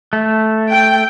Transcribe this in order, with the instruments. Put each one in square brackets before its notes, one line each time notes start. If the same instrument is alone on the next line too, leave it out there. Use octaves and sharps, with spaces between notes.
[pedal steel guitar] A3
[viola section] G5